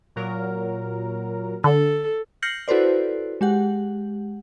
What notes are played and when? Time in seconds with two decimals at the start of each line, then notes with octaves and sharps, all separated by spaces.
0.16 A#2 F#3 A#4
1.64 D3 A4
2.42 F6 G6 A#6 C7 C#7 F#7
2.68 E4 F#4 A4 B4 C5 D5
3.41 G#3 G4 F#5